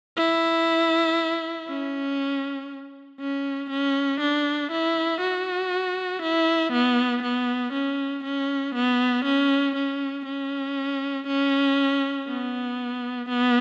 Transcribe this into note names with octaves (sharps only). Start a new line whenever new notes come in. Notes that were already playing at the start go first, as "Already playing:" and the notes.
E4
C#4
C#4
C#4
D4
E4
F#4
E4
B3
B3
C#4
C#4
B3
C#4
C#4
C#4
C#4
B3
B3